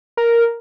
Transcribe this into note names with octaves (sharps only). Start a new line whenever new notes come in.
A#4